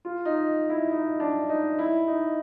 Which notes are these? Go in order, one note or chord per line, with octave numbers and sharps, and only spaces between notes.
F4
D#4
E4
D#4
D4
D#4
E4
D#4